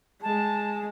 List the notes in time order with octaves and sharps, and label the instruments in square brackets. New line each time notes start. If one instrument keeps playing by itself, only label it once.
[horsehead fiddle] G#3 [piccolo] A5